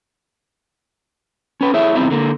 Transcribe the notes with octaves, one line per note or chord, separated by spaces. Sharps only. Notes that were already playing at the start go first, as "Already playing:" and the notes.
C#4 B4
E4 G#4 C#5 E5
E2 C3 G3 C4 D#4 E4
D3 A#3